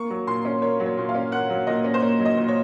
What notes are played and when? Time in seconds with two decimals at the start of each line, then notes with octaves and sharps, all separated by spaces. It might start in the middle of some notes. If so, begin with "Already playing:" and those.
Already playing: A#3 C#6
0.10 F#3
0.27 A#2 C6
0.45 C#4
0.62 A#3 C#5
0.80 F#3
0.86 C#5
0.97 A#2
1.09 F5
1.15 C#4
1.32 A#3 F#5
1.50 F#3
1.67 A#2 D#5
1.84 C#4
1.94 C5
2.02 A#3 C#5
2.20 F#3
2.25 D#5
2.37 A#2
2.48 C#5